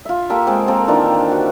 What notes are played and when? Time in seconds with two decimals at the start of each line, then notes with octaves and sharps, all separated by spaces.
0.05 F4 E5
0.30 A#3 F4 G4 A4
0.47 G#3 C4 F#5
0.68 A#3 C4 A4 A#4
0.88 D#3 E3 D4 F4
1.31 F#4